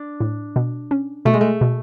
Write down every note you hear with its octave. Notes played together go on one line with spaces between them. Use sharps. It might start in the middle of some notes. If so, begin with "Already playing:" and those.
Already playing: D4
A2
B2
C#4
B2 A3
G#3
A3
B2